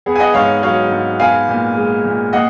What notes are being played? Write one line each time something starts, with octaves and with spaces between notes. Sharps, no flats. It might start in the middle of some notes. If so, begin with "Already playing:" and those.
B3 G#4
G#5
D#5 F#5
G#2 C#5 F5
F#3 C#5 F5
G#2
B3 F5 G#5
A#2
G#3
A#2
A#3 D#5 F#5